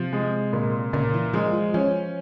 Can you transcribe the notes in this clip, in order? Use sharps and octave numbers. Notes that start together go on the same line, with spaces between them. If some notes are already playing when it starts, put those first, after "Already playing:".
Already playing: C3 F3
G#3
A#2
A#2 C#3
E3
F3 G#3
F3
F3 C#4